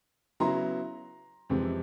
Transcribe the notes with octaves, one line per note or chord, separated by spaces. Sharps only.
C#3 F#3 B3 E4 A#5 C6
F2 C3 E3 G#3 C4